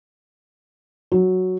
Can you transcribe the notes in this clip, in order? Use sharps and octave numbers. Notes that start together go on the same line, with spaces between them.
F#3